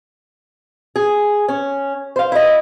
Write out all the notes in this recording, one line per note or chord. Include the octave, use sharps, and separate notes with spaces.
G#4
C#4
C5 F5
E4 D#5